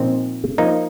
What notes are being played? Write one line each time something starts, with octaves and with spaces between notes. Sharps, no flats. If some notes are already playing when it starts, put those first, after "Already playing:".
Already playing: A#2 F3 C4 D#4
F3 A#3 D#4